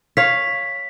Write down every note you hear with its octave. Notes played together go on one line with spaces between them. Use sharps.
C#5 F5 B6